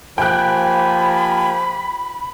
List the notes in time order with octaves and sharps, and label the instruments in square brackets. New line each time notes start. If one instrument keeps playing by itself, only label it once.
[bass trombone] F3 [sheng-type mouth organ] A#3 G4 G#5 [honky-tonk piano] G5 F#6 [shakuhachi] B5